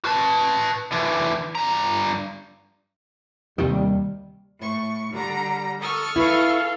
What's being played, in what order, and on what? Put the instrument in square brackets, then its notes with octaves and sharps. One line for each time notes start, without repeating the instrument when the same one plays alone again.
[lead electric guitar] B4 A5
D3 E3
G2 A#5
[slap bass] D#2 C3 D#3 [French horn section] G3
[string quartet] A2 C#6
[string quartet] D3 A#5 [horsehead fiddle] G3
[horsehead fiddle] A4 [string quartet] C#6 D#6 F6
[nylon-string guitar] E4 B4 [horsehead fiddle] A4 F5